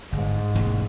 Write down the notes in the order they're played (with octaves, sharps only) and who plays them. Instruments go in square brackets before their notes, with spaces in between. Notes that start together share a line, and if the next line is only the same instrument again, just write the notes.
[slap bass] G1 [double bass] G#2
[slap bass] E1 A1 D#2